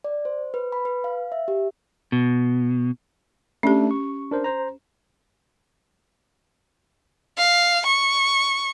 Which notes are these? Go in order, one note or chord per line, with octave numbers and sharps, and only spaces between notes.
D5
C5
B4
B5
B4
F5
E5
G4
B2
A3 C#4 D4 G4
C#6
D4 A#4 C5
C5 A#5
F5
C#6